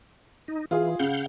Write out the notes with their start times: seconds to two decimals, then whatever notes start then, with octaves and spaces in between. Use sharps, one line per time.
0.48 D#4
0.71 E3 F4 G#4
1.00 C#3 F5 F#5 G6